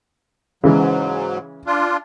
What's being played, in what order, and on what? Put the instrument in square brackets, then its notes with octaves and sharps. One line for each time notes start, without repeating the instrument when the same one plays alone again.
[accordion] G#2 F#3 [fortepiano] C#3 E3 G#3
[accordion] D4 F4